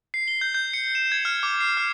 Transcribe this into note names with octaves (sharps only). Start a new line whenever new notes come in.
C7
G7
G6
G6
C#7
E7
G#6
F6
D6
C7
F6